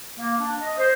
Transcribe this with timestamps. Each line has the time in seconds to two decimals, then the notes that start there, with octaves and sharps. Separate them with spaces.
0.18 A#3
0.39 D4
0.61 D#5
0.78 C5